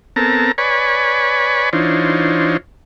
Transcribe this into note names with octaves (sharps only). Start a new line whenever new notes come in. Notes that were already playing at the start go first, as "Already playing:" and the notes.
B3 C4 A4 A#4 A5 A#5
B4 C#5 D5 G#5 B5 C#6
E3 D4 D#4 F4 C5 C#5